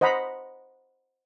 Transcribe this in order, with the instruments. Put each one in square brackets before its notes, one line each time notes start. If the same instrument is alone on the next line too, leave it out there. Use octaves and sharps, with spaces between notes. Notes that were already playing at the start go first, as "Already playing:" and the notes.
[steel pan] C5 D#5 F#5 A#5 B5